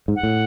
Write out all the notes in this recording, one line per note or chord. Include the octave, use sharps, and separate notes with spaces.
G#2
F#5
A2